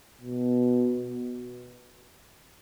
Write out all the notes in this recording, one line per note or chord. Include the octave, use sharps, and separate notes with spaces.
B2